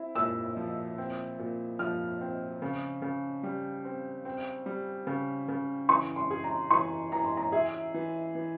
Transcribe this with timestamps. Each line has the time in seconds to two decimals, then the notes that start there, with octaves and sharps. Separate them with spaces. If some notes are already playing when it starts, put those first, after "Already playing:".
Already playing: C4 E4
0.15 A#2 E6
0.57 F3
0.98 C4
1.39 A#2
1.79 F3 F6
2.21 C4
2.62 C#3
3.02 C#3
3.43 G3
3.85 C4
4.25 C4
4.66 G3
5.07 C#3
5.48 C#3
5.88 E3 C#6
6.16 C6
6.31 G#4
6.44 A#5
6.70 E3 C#6
7.12 E3 A#5
7.24 C6
7.37 A#5
7.52 G#4 E5
7.94 E3
8.35 E3